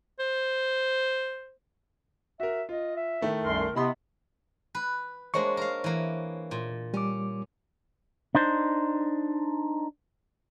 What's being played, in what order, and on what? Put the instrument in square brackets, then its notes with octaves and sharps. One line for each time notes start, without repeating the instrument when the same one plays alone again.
[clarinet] C5
[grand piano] F#4 A#4 [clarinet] E5
[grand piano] F4 [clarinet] D#5
[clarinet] E5
[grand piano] D#3 A3 E4
[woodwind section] C2 F#2 C6 [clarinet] A#4
[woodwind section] C3 B3 [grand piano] E4 B5 C6 [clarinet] D#5
[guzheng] B4
[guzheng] G#3 A#3 D4 [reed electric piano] C5 C#5 C#6
[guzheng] A#4 F5
E3 A#3
A#2
[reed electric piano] G3 D6 [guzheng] C#4
[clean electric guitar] D4 D#4 C5